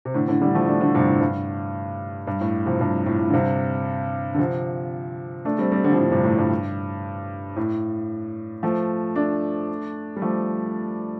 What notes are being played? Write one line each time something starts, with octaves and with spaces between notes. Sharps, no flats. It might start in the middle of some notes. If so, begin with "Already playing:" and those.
C3
A2 D3
A2 D3
D3 G3
F3 A3
A3 D4
A2 D3
G2 C3
A2
G2
G2
A2
C3 F3
G2 C3
A2
A2
D3
G2 C3
D3
C3 F3
A3 D4
G3 C4
G3 C4
D3 G3
F3
A2 D3
G2 C3
A2
G2
A2
F3 A3
A3 D4
G3
F3 A3